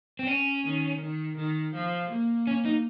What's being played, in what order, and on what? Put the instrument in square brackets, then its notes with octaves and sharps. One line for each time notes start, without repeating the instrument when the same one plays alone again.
[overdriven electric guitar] C4
C#4
[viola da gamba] D#3
D#3
D#3
F3
A#3
[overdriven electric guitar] C#4
D#4